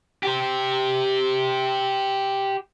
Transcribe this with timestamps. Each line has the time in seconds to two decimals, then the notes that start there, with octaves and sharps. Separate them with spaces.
0.23 G4 C5